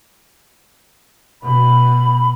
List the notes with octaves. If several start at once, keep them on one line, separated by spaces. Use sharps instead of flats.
B2 B5